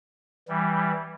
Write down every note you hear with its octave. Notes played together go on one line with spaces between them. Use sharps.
E3 G3